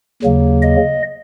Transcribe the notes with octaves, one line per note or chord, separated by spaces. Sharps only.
D#2 C#3 F#3 A#3
D#5